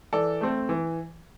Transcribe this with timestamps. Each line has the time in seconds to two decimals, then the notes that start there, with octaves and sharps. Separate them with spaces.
0.13 E3 A4 D5
0.41 A3 C4
0.69 E3